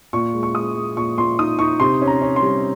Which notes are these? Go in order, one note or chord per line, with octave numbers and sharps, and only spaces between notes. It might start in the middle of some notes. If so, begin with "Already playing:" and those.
A#2 C#6
G#3
C#6
G#3 D#6
G#3
A#2 C#6
A#2 C6
D#4 D#6
D#4 C#6
C3 C6
C#4
A#5
C#4
C6
G3